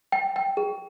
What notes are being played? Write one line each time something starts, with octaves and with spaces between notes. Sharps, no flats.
G5
G5
G#4